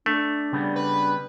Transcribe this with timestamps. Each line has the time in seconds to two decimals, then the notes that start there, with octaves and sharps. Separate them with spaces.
0.06 A3 D4
0.52 C#3 G3 B3
0.76 B4